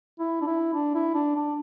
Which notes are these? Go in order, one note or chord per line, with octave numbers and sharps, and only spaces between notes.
E4
D4
E4
D4
E4
D4
D4